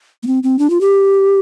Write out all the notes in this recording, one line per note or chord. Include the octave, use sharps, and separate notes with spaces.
A#3
C4
C4
D4
F4
G4